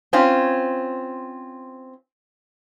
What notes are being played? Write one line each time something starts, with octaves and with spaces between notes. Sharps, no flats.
C4 C#4 F4